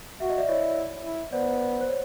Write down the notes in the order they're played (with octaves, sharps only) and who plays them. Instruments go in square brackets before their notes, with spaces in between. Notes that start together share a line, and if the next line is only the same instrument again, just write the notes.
[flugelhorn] F#4 [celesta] E5
[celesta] D#5
D5 E5
[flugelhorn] E4 [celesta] C#5 D#5
[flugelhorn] E4
[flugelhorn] B3 [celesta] C5 D5
[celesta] C5
C#5